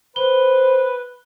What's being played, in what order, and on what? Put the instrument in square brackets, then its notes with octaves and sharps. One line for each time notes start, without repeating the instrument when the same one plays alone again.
[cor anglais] B4 [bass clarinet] C5 [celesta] G7